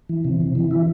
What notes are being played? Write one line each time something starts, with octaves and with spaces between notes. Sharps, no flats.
E3
C3
C3
E3
E4